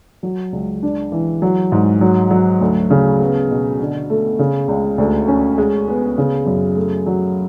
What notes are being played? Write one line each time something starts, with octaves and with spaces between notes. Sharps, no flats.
F#3
C#2
D4
E3
F#3
G#2
F#3
F#3
D2
C#3
B3
B2
D3
A3
C#3
C#2
D2
C#4
G#3
B3
C#3
F#2
A3
F#3